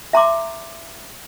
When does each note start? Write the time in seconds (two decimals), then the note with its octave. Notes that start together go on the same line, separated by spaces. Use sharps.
0.13 E5 A#5 C6 D6